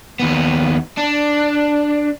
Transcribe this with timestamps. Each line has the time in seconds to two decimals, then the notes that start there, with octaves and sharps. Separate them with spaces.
0.20 D#2 B3
0.97 D4